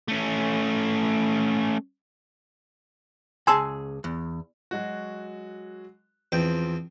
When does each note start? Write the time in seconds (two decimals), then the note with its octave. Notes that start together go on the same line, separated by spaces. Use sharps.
0.08 A3 C#4
3.47 C#2 G#4 G#5 A5 C6 E6
4.04 E2
4.71 F#3 G#3 F#4
6.32 E2 F3 C4 G5